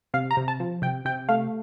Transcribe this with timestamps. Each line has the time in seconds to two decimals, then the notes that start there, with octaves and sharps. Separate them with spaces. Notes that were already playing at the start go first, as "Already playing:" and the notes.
0.14 C3 F5
0.31 A#5
0.37 C3
0.48 A5
0.60 F3
0.82 C3 G5
1.05 C3 G5
1.29 A3 F5